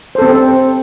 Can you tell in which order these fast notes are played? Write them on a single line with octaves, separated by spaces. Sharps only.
C5 A4 C4